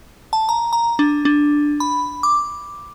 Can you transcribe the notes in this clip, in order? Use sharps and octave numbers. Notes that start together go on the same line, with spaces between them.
A5
A#5
A#5
D4
D4
B5
D6